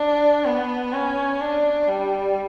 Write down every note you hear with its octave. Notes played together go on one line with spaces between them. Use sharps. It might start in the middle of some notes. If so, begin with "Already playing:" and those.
Already playing: D4
B3
C#4
D4
G3